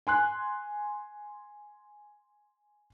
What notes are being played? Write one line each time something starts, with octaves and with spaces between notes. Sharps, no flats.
G#5 C6 F#6